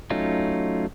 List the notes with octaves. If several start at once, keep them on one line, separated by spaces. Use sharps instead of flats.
F#3 A3 C#4 D#4 F4